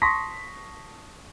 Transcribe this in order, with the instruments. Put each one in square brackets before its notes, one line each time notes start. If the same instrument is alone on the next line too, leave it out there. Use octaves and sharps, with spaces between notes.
[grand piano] A5 C6 C#6 D#6 A#6 B6